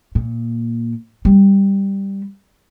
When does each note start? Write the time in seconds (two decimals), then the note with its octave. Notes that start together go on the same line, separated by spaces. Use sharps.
0.15 A#2
1.25 G3